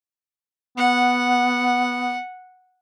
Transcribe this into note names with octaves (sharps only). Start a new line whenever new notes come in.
B3 F#5